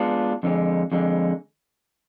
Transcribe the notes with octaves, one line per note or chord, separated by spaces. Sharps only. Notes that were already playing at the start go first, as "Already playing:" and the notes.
Already playing: G#3 B3 D4 F4
F2 D3 G#3
F2 D3 G#3